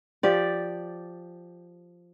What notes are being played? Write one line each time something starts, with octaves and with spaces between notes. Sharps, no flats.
F3 G4 D5